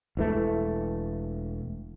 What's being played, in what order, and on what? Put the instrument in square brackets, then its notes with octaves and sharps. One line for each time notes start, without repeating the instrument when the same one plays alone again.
[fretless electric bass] E1 E3 A3